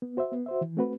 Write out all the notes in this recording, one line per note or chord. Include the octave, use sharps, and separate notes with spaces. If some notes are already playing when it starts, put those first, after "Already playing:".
B3
F#4 C5 E5
B3
F#4 C5 E5
E3
A3 C4 F#4 B4